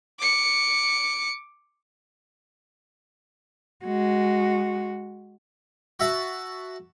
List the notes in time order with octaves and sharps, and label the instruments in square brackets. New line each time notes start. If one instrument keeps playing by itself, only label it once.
[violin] D6 C#7
[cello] G#3 F#4
[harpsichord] F#4 E5 A5